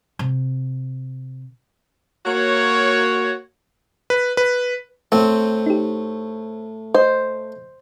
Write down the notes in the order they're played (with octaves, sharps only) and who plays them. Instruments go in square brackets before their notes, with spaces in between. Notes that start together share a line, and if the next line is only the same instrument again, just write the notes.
[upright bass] C3
[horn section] A#3 F#4 C#5
[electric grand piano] B4
B4
[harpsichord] A2 A3 [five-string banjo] C4
[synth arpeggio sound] D#4 G4
[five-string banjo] C5 [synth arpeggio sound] D#5